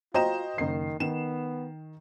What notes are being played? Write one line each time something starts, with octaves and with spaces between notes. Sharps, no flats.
F4 F#4 C5 D#5 G5 A#5 E7
F#1 D#3 C7
D#3 B3 E7